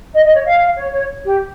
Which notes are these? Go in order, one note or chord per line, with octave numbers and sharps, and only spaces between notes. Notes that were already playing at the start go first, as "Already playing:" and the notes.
D#5
D#5
C#5
F5
C#5
C#5
G4